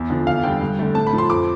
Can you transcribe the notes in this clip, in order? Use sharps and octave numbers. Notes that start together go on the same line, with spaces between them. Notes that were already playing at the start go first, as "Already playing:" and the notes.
Already playing: E2
D3 F3
E2 F5
D3 G3 G5
G2
D3 A3
A2 A5
B5
F3 A3
C6
F2 D6